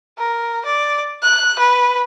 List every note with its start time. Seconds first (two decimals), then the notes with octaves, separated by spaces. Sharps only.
0.18 A#4
0.66 D5
1.23 F#6
1.59 B4